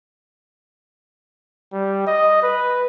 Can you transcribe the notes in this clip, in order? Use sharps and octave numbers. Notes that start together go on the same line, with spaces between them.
G3
D#5
B4